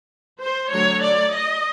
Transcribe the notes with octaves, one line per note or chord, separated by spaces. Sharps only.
C5
D3 F#3 A3 C#5
D5
D#5